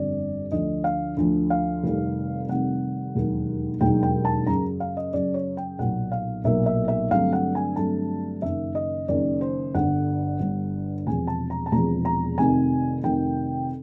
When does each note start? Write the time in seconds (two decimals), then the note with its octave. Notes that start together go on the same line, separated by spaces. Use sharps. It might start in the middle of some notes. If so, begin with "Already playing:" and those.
Already playing: G1 F2 D3 G3 C4 D5
0.51 D2 D3 F3 D#5
0.84 F5
1.17 D2 D3 F3
1.50 F5
1.83 F1 F2 C3 D#3 G3
2.49 F1 F2 C3 D#3 G3 F#5
3.15 E1 D#2 D#3 F#3
3.81 E1 D#2 D#3 F#3 G5
4.03 G5
4.25 A5
4.46 F#2 C#3 F#3 A#5
4.80 F5
4.97 D#5
5.13 F#2 C#3 F#3 D5
5.34 C#5
5.57 G5
5.79 B1 A#2 F#3 A#3 F#5
6.12 F5
6.44 B1 A#2 F#3 A#3 E5
6.66 E5
6.88 E5
7.10 G2 D3 F#3 A3 C4 F5
7.33 F#5
7.55 G#5
7.76 G2 D3 F#3 A3 C4 A5
8.42 F#1 F#2 D#3 E5
8.75 D#5
9.08 F#1 F#2 D#3 D5
9.41 C5
9.74 G1 G2 D3 F#5
10.40 G1 G2 D3
11.07 E1 E2 C3 F3 G#5
11.27 A5
11.50 A#5
11.66 A5
11.72 E1 E2 C3 F3 A#5
12.05 A#5
12.38 F1 F2 C3 D#3 G#5
13.03 F1 F2 C3 D#3 G5